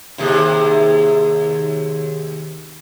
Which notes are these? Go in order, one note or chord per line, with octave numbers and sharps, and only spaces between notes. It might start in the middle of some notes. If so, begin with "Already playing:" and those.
D#2 C3 G#4